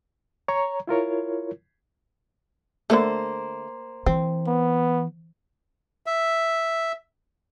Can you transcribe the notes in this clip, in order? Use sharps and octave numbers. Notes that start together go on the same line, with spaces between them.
C#5 A#5 C#6
E4 F4 A#4 C#5
D3 A3 A#3 C5
E3 C4
B3
E5